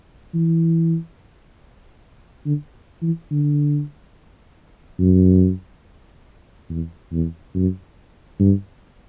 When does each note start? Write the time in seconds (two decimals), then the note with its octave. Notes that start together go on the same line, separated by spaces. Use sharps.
0.34 E3
2.46 D3
3.02 E3
3.31 D3
5.00 F#2
6.69 E2
7.12 E2
7.55 F#2
8.39 G2